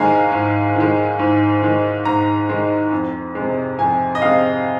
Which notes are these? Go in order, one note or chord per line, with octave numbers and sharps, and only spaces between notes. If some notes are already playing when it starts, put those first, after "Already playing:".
Already playing: G#2 D#3 G#3 F5 G#5 A#5
G#2
D#3 G#3
G#2
D#3 G#3
G#2 A#5
D#3 G#3
F2
C3 G#3
F2 G#5
D#5
C3 G#3 F5